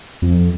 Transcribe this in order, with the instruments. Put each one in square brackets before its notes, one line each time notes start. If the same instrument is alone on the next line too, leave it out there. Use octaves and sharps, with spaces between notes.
[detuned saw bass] F2